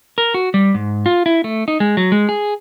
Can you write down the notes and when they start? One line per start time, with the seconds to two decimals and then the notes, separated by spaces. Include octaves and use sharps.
0.18 A#4
0.34 F#4
0.54 G3
0.74 G#2
1.06 F4
1.26 E4
1.44 A3
1.68 D#4
1.80 G#3
1.97 F#3
2.12 G#3
2.29 G#4